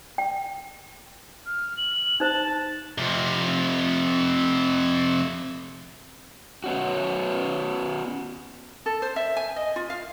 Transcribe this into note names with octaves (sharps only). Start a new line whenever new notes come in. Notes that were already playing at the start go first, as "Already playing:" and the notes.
G5
F6
F#7
D#4 C5 A5
F2 C3
B3 C#4 F#4
A4
C5
E5
G#5
D#5
F4
F5